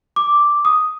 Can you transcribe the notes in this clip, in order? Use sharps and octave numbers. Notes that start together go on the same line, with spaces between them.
D6
D#6